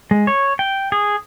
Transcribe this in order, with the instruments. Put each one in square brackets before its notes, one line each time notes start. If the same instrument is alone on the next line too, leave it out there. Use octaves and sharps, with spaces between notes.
[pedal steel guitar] G#3
C#5
G5
G#4